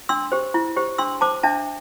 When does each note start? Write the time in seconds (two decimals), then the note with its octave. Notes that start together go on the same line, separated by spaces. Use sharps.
0.09 D4 C6 E6
0.32 G4 C5
0.54 E4
0.77 G4 C5
0.98 D4 C6 E6
1.21 C5 A5 D6
1.43 D4 E5 A5